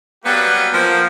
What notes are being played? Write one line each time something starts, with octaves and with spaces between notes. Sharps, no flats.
F#3 G3 A#3 B3 F#4 B4
F3 A#3